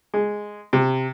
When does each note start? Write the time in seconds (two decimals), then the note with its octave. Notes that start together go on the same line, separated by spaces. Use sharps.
0.14 G#3
0.73 C3